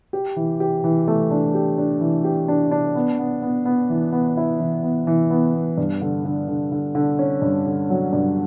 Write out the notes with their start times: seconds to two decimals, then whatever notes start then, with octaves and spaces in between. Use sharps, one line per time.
0.13 G4
0.36 E3
0.60 G4
0.84 E3
1.08 A3
1.31 D4
1.54 G4
1.78 D4
2.01 E3
2.24 G4
2.48 D4
2.71 D4
2.95 B3
3.19 B3
3.42 B3
3.65 B3
3.89 E3
4.12 B3
4.37 E4
4.60 E3
4.83 B3
5.07 E3
5.30 B3
5.54 B3
5.78 G2
6.01 D3
6.25 D3
6.48 D3
6.72 D3
6.95 D3
7.19 C#4
7.42 G2
7.66 D3
7.90 F#3
8.13 G2